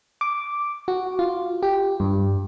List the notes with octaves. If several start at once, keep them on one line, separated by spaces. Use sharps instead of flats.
D6
F#4
F4
G4
G2